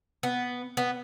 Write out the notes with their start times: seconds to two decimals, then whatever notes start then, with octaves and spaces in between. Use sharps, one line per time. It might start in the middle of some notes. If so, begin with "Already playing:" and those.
0.23 B3
0.77 B3